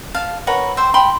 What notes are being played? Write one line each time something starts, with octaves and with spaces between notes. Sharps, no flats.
F5 A5
A#4 B4 C#5 F#5
C5 E5 G5
G5 B5 C6